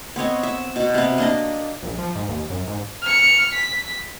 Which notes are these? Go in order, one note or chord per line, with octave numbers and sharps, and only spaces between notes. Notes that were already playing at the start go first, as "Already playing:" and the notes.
B3 C4 C#5 D#5
E5
B2 F#4
C3 B3
A#3 D4 D#5
A#1
F3
G#2
D#2
F#2
G#2
F6 C#7
B6